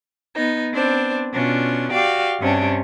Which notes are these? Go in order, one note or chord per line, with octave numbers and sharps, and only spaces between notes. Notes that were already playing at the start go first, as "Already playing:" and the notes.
B3 D#4
B3 C4 D4 C5
B2 C#4 D4 F4
F#4 G4 D5 F5
G2 C3 C#4 D4